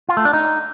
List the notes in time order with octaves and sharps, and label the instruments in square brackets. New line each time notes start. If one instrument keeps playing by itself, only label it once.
[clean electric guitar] F4
A3
D4
D#4